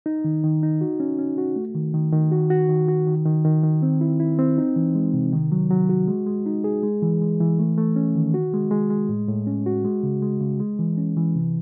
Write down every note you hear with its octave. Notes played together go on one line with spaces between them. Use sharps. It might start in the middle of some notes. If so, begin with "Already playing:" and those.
D#4
D#3
D#3
D#4
F#4
C#4
C#4
F#4
A3
D#3
D#3
D#3
F#4
F#4
D#3
F#4
D#3
D#3
D#3
D#3
C4
E4
E4
C4
D#4
E3
G#3
C3
D#3
F#3
F#3
F#4
G#3
G#3
D#4
G#4
G#3
E3
G#3
E3
A3
A3
C#4
D#3
F#4
G#3
G#3
G#3
A2
A2
C#4
F#4
G#3
C#3
G#3
C#3
G#3
E3
C#4
E3
C3